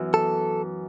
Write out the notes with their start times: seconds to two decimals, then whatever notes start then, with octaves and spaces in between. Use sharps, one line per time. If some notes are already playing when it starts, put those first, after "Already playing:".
Already playing: F#2 E3 B3 F#4
0.14 A4